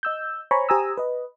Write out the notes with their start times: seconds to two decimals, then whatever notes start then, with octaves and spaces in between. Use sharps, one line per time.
0.03 D#5 E6 G6
0.51 C5 C#5 G#5 A#5 B5 C#6
0.69 G4 C5 G#5 A#5 D#6 E6
0.97 B4 D#5